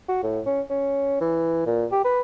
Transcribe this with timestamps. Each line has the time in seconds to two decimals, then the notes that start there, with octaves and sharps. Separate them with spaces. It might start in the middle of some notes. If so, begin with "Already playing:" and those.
0.08 F#4
0.23 A2
0.46 C#4
0.70 C#4
1.21 E3
1.66 A#2
1.92 G4
2.05 B4